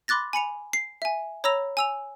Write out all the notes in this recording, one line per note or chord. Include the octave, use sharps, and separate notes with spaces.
B5 C6 D6 F#6 A6 A#6
G#5 B5 C#7 F7
C7
E5 G#5
C#5 A#5 B5 E6 A#6 F7
G#5 E6 F7